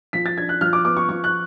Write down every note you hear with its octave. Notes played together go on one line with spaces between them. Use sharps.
F3 B6
A6
D4 G#6
F#6
F3 F6
D6
B3 D6
C#6
F3 C#6
F#6